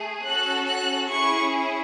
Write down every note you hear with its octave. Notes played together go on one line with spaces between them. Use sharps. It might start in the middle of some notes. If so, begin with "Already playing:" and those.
Already playing: A3 G#4
C#4 F#4 A4 F#6
F#6
C#4 E4 G#4 C#6